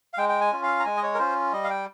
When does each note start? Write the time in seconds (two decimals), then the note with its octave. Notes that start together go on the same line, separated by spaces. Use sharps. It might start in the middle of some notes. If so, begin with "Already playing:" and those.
0.13 F5
0.18 G#3 G5
0.29 G5
0.41 G#5
0.52 C#4 F4
0.63 F5
0.80 A#5
0.85 G#3 G#5
0.97 D#5
1.03 C#5
1.14 A#4
1.19 C#4 F4 C5
1.53 G3 D#5
1.64 F5
1.70 G5